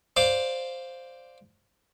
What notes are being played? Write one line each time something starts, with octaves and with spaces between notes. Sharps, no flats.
C5 D5 F5 D6